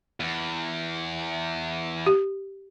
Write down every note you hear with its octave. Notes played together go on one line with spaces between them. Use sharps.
E2
G4